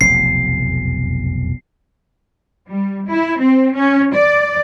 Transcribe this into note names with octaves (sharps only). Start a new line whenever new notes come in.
F1 B1 E2 C7
G3
E4
C4
C#4
D5